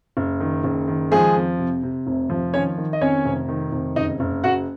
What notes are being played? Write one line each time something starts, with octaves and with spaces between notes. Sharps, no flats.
F#1
D#3
F#1
D#3
F3 G#3 G#4
F2
C3
C3
F1
F3
D#3 C#4 C#5
D#3
D#5
F2 C#4 C#5
F1
D#3
F1
F#1 D#4 D#5
F#1
F#1 F#4 F#5